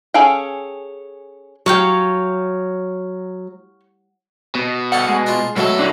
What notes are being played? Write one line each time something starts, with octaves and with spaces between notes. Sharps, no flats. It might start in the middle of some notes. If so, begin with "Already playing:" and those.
C#4 G#4 A4 F5 G5
F#3 C#5 F5 G5
B2
C2 D4 A4 F#5
G#3
D4 F4
B1 A2 F#3 A3 A4
D#3 E3 D4